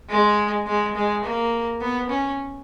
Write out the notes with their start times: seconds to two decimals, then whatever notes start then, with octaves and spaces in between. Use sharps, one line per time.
0.09 G#3
0.66 G#3
0.95 G#3
1.24 A#3
1.81 B3
2.10 C#4